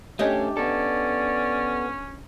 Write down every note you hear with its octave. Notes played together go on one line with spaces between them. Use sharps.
A3 C#4 D4 G4 C#5 D#5
B3 C#4 A4 D5